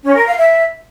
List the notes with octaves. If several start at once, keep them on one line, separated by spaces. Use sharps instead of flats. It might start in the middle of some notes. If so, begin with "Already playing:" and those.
C#4
A#4
F5
E5